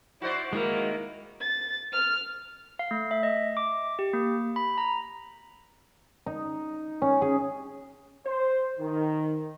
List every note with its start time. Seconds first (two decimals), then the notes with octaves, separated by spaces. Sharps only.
0.22 E4 F#4 C5 D5
0.53 D#3 G#3 A#3 E4 F#4 F5
1.41 A6
1.92 F6
2.79 F5
2.91 A3
3.11 E5
3.23 D#5
3.57 D6
3.99 G4
4.13 A#3
4.56 B5
4.78 A#5
6.26 D#4
7.02 C#4
7.22 G#4
8.26 C5
8.79 D#3